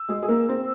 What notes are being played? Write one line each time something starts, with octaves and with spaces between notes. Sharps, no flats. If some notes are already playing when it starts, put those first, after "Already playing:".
Already playing: E6
G#3 G#4
G#4
A#3 A#4
C4 C5